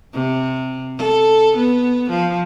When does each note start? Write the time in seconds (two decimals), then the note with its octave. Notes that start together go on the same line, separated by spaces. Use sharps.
0.13 C3
0.97 A4
1.56 B3
2.10 F3